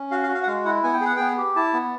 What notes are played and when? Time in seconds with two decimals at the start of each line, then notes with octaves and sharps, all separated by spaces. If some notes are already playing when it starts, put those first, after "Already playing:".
Already playing: C#4
0.11 F#4 F5
0.23 F5
0.28 F#4
0.34 F5
0.43 F#5
0.47 G#3 F5
0.64 E4 F#5
0.83 B3 G#5
0.93 G5
1.01 G#4 F#5
1.16 B3 G5
1.38 G4
1.56 E4 A5
1.73 B3